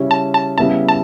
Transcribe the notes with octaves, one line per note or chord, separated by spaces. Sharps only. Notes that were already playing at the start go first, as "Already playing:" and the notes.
Already playing: C#3 G3 C#4 E4
A5
A5
C#3 G3 B3 E4 A5
A5